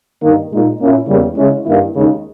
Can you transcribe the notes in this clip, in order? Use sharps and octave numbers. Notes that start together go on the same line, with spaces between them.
G2 D#3 A#3 D#4
A#2 G#3 D#4
A#2 A#3 C#4 E4
E2 C#3 G3 A#3
C#3 G#3 C#4 E4
G2 D#3 A#3 E4
D#2 C#3 G#3 D#4